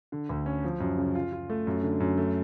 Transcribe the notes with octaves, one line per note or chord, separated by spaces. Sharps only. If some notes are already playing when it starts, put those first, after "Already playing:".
D3
D2
C#4
F3
F#2
C#3
F4
F4
A3
F#2
D3
F#2
A3